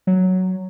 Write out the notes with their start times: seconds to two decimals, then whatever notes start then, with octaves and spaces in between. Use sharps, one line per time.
0.07 F#3